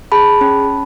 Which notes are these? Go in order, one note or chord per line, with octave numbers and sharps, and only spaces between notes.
G#4 A5 B5
C#4